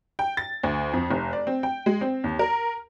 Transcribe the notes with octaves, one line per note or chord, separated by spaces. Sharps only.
G5
A6
D2
F2
F1
D5
C4
G5
G#3
C4
D#2
A#4